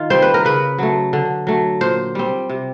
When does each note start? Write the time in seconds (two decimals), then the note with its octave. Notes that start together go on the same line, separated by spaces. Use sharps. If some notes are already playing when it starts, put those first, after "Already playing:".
Already playing: D#3 F4
0.10 G3 C4 C5
0.22 B4
0.34 A#4
0.45 C#3 B4
0.78 F#3 A3
1.13 D3
1.47 F#3 A3
1.81 A#2 C5
2.15 G3 C4
2.49 C3